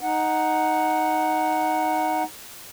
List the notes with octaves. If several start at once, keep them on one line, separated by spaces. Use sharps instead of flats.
D#4 F#5